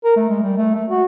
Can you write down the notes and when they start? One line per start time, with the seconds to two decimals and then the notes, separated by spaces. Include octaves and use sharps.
0.04 A#4
0.16 A3
0.29 G#3
0.43 G3
0.58 A3
0.75 A3
0.90 F#4